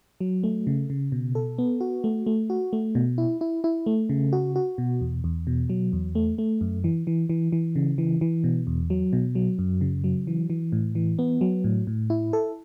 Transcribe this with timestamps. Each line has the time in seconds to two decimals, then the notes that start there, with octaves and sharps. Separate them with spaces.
0.21 F#3
0.44 A3
0.67 C#3
0.90 C#3
1.12 B2
1.35 A4
1.58 B3
1.81 F#4
2.04 A3
2.26 A3
2.50 F#4
2.73 A3
2.95 B2
3.18 E4
3.41 E4
3.64 E4
3.86 A3
4.09 C#3
4.33 F#4
4.56 F#4
4.78 B2
5.01 E2
5.24 E2
5.47 B2
5.70 F#3
5.93 E2
6.15 A3
6.38 A3
6.61 F#2
6.84 E3
7.07 E3
7.29 E3
7.52 E3
7.76 C#3
7.98 E3
8.21 E3
8.44 B2
8.67 E2
8.90 F#3
9.13 B2
9.35 F#3
9.59 F#2
9.81 C#3
10.04 F#3
10.27 E3
10.50 E3
10.72 A2
10.95 E3
11.19 B3
11.41 F#3
11.64 A2
11.87 A2
12.10 E4
12.33 A4